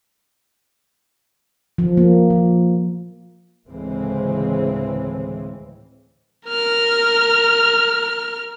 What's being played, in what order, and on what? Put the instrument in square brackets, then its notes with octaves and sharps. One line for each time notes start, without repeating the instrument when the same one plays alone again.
[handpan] F3
A#3
F3
[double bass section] D2 A2 C#3 E3 G#3 C4
[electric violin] A#4 F6